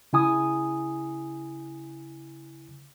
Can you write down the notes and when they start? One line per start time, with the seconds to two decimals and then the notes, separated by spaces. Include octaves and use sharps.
0.13 C#3 E4 G#5 D#6